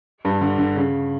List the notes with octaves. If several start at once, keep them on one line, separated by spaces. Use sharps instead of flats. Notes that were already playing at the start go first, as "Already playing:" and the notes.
G2
D3
D3
C#3